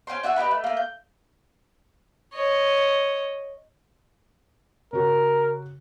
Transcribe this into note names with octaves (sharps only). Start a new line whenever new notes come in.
C#4 G4 C5 C6
D4 F#4 E5 G#5
D#4 G4 B4 B5
A3
A3 A#3
G6
C#5 D#5
C#3 F#4 G4 A#4